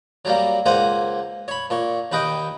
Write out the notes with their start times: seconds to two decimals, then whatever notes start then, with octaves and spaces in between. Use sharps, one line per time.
0.25 F#3 G3 A#3
0.66 C#2 A#3 C5 F#5 G#5
1.48 C#5 B5
1.70 A#2 C#5
2.12 D#2 B4 D#5 G5